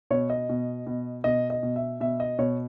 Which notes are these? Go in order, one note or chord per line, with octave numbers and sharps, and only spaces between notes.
B2 C#5
D#5
B2
B2
B2 D#5
D#5
B2
E5
B2 E5
D#5
B2 C#5